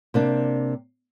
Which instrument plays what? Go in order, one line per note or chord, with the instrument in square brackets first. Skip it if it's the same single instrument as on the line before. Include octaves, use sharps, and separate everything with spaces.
[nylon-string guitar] C3 A#3 D4